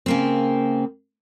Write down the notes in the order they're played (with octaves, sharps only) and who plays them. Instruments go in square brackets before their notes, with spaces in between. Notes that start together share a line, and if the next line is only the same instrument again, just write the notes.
[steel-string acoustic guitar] C#3 A#3 C4